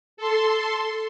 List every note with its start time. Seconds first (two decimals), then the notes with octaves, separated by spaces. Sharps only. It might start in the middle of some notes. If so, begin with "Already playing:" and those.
0.17 A4 C6